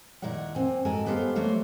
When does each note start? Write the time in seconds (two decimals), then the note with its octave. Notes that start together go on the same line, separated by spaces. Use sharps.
0.22 D#2 A#2 E4 A#4 D5 F#5
0.55 C4 G#5
0.85 G#2 F#4 A4 A#4 G#5
1.06 B3 G4 A4 C5 F5
1.35 F#3 A3 A#3 A#4 C5